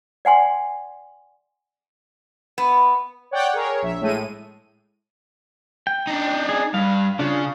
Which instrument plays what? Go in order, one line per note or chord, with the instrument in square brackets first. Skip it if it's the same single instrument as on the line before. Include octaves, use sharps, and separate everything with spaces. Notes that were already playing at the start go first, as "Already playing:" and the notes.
[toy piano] D5 F#5 G#5 C6
[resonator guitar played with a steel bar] B3
[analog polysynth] C#5 D5 F#5 G5 D6
G#4 A#4 C#5
A#1 E5
A2 G#3 D#7
[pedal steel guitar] G5
[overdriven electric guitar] D4 D#4
[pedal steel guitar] G#4
[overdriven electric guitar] G2 [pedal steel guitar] F5
[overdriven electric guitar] C#3 [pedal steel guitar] D4 F4